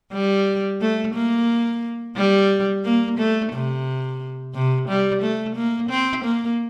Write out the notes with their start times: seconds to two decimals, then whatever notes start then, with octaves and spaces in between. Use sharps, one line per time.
0.13 G3
0.81 A3
1.14 A#3
2.16 G3
2.84 A#3
3.18 A3
3.53 C3
4.54 C3
4.88 G3
5.22 A3
5.56 A#3
5.90 C4
6.24 A#3